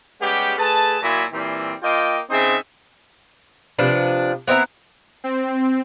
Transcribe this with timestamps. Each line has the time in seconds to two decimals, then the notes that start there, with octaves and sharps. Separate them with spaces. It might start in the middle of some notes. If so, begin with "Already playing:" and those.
0.21 G3 G#3 B3 C#4 G4
0.58 A3 G#4 B4 A5
1.02 A#2 F#3 E4
1.32 A#2 E3 G3 C4
1.83 A#3 F4 D#5 G5
2.30 C#3 C4 D#4 C5 D#5 E5
3.78 C3 F3 D4 B4
4.48 B3 C4 E4 A#5
5.24 C4